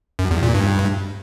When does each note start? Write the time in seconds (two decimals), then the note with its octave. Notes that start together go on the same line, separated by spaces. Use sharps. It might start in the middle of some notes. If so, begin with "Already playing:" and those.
0.19 F#2
0.31 E2
0.43 A#2
0.54 G2